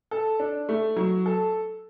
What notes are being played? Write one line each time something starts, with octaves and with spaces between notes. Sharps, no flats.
A4
D4
A3
F#3
A4